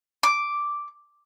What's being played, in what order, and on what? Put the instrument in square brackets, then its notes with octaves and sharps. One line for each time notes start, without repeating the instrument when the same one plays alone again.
[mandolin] D6